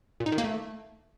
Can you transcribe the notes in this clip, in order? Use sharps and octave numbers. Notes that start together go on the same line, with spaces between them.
A#2
D#4
D#3
A#3
A3